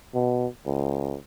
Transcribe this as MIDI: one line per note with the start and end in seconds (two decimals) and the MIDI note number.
0.14 0.47 47
0.66 1.17 37